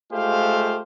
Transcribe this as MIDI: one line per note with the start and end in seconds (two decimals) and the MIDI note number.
0.12 0.81 56
0.12 0.81 57
0.12 0.81 65
0.12 0.81 67
0.12 0.81 72
0.12 0.81 77